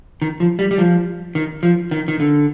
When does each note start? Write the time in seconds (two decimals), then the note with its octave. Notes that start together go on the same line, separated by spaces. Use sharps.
0.22 D#3
0.40 F3
0.59 G3
0.71 G3
0.78 F3
1.35 D#3
1.63 F3
1.91 D#3
2.08 D#3
2.20 D3